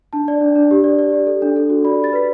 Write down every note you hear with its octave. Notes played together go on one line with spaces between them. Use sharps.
D4 A5
D5
D4
D4
G4
D5
D5
G4
A4
D4
A4
F#4
D5 B5
G4 A6
B4 B6